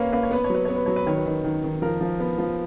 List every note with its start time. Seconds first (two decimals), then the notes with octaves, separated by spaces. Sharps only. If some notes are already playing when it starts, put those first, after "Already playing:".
Already playing: A#3 C#4 B4 C#5 F5
0.13 A#3 B4
0.23 C#5
0.31 B3 B4
0.44 C#5
0.50 F#3 B4
0.65 B3 C#5
0.76 B4
0.86 F#3 C#5
0.96 B4
1.06 D#3 C#5
1.17 B4
1.26 D#3
1.44 D#3
1.64 D#3
1.82 F3 A#4
2.01 F3
2.20 B3
2.38 F3